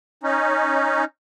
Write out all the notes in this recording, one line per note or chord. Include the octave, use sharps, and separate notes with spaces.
C#4 D#4